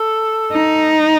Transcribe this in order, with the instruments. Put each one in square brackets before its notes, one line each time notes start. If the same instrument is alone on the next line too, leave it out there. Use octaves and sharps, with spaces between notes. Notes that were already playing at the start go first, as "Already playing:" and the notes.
Already playing: [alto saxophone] A4
[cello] D#4